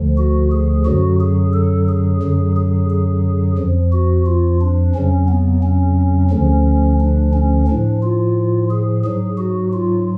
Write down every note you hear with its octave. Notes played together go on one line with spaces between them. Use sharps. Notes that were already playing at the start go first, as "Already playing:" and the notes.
Already playing: D2 D3 F3
F#4
G#4
F#2 D3 F#3 F#4
G#4
A4
G#4
F#2 D3 F#3 G#4
G#4
G#4
F2 F3
F#4
F4
D4
F2 C#3 F#3 C#4
B3
C#4
D2 D3 F3 C#4
D4
C#4
A2 F3 D4
F4
G#4
G#2 F#3 G#4
F#4
F4